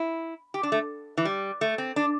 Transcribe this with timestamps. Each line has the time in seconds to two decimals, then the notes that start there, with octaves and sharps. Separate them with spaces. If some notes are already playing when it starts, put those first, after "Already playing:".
Already playing: E4
0.54 G4
0.63 D4
0.72 A3
1.17 E3
1.25 G3
1.61 A3
1.78 C4
1.96 D4